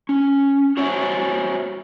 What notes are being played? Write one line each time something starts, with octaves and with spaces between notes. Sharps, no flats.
C#4
F#4 C5 C#5 E5 G#5